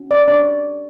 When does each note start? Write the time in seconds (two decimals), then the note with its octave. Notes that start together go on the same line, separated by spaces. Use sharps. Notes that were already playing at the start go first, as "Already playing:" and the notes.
Already playing: C#4 F#4
0.11 D5
0.28 D4 G4 C#5 D5